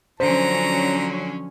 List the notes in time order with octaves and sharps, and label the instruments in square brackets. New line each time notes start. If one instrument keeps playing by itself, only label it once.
[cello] D3 F#3 [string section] F3 C#4 [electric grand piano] C5 [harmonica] A#5